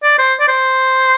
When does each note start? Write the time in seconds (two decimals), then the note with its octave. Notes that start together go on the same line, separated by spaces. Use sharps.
0.03 D5
0.18 C5
0.40 D5
0.48 C5